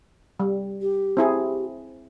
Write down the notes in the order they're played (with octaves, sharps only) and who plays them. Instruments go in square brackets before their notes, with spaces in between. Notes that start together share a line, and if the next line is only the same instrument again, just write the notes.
[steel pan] G3
[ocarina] G4
[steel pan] C4 E4 G#4